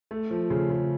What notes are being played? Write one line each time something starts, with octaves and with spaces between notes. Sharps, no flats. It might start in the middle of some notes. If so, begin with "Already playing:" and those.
A3
F3
C#3
C#3